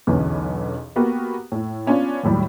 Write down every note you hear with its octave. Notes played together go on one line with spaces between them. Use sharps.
B1 E2 D3 C#4 B4
A#3 B3 F#4 G4 A#4
A2
B3 C#4 D4 F4
D#2 A2 F#3 G3